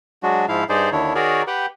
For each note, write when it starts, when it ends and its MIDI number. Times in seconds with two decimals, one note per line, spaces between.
0.23 0.46 54
0.23 0.46 56
0.23 0.46 62
0.23 0.46 66
0.48 0.64 44
0.48 0.64 53
0.48 0.64 64
0.48 0.64 77
0.69 0.90 43
0.69 0.90 63
0.69 0.90 68
0.69 0.90 72
0.69 0.90 74
0.92 1.13 39
0.92 1.13 50
0.92 1.13 51
0.92 1.13 62
0.92 1.13 64
0.92 1.13 73
1.15 1.43 51
1.15 1.43 66
1.15 1.43 68
1.15 1.43 70
1.15 1.43 73
1.15 1.43 74
1.47 1.66 67
1.47 1.66 71
1.47 1.66 78
1.47 1.66 79